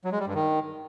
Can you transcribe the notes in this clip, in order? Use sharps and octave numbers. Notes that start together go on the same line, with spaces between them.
F#3
G#3
G3
G2
D#3